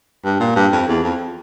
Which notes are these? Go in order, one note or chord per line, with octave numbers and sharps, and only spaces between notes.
G2
A#2
G2
F2
E2
F2